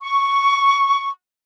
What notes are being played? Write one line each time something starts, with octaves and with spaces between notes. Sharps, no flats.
C#6